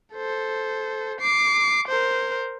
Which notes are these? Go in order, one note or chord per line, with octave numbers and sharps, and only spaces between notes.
A4 C5
D6 C7
A#4 C5